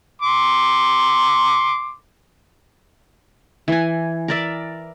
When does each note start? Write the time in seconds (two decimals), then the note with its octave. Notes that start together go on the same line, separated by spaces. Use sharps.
0.22 C6 D6
3.68 E3 G#5
4.28 A#4 D5 E5